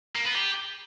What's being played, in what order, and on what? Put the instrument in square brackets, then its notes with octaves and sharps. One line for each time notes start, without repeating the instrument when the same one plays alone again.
[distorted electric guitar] A#3
B3
G4